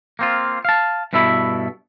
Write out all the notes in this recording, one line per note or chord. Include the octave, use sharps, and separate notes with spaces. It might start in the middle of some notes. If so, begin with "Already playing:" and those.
A#3 C4 F4
F5 A5
G2 B2 E4 A4 E5 B5